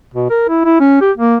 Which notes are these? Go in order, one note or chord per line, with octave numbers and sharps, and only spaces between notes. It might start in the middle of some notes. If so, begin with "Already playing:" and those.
B2
A#4
E4
E4
C#4
G4
A#3